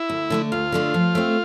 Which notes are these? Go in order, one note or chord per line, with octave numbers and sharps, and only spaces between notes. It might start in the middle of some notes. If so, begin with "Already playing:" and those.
Already playing: E4
D2
D3 A3 D4
D2 F4
D3 A3 D4
F3
A3 C4